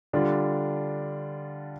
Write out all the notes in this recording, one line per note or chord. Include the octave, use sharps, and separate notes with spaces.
D3 G3 D4 F4